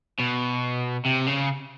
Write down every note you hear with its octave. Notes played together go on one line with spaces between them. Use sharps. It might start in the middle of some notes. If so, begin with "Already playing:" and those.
B2
C3
C#3